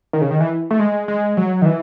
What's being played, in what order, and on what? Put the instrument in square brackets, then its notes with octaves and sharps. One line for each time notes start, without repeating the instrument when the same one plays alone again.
[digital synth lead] D#3
C#3
D#3
E3
A3
G#3
G#3
F#3
D#3
E3